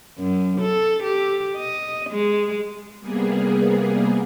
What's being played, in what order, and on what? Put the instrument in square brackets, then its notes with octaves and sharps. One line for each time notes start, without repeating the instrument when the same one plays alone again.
[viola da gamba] F#2
A4
G4
D#5
G#3
[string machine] C3 G3 A#3 B3 G#4